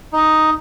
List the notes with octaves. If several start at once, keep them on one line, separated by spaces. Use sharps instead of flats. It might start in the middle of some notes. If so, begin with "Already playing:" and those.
D#4